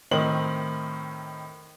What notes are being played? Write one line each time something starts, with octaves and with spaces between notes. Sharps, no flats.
A2 D#3 C4 D#4 A#4 F#7